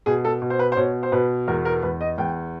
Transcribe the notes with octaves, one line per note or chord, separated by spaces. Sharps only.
B2 G#4
A4
B2
C5
B4
C5
B2 C#5
C5
B2 B4
E2 A#4
A#4
E2 B4
D#5
E2 G5